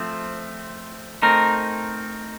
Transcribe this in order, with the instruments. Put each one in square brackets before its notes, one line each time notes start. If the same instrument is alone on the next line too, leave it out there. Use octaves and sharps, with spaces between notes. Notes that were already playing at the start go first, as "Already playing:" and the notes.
Already playing: [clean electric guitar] F3 A3 C4
A3 C4 D#4 A#4